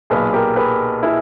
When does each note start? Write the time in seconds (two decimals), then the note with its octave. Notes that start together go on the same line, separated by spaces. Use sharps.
0.10 B1 A#2 G#4 B4
0.33 G4 A#4
0.56 G#4 B4
1.03 E4 G#4